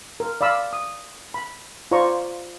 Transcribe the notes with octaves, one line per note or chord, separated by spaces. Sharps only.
A#4
D5 F5 B5 E6
D#6
B5
F4 C5 D5 A#5 C#6